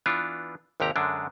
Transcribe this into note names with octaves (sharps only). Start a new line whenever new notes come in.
E3 B3 D4 F4
G#1 D#2 C3 G4 A#5
F#2 D3 G#3 D4